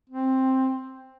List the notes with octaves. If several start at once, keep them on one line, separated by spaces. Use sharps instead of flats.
C4